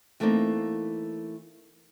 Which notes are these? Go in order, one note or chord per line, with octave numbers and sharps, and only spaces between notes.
E3 A3 A#3 C4 D#4